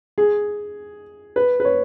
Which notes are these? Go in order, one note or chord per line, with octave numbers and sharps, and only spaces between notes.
G#4
B4
B4
C#5